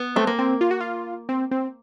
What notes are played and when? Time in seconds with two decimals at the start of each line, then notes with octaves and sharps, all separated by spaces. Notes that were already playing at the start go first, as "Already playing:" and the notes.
Already playing: B3
0.16 A3 C4
0.27 A#3
0.39 C4
0.61 F4
0.71 F#4
0.80 F4
1.29 C4
1.51 C4